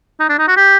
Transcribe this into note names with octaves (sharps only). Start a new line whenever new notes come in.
D#4
D4
D#4
F#4
G4